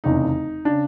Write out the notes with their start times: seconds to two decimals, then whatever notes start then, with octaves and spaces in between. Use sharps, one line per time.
0.04 F1 E2 C#3 D#4
0.65 C#3 D4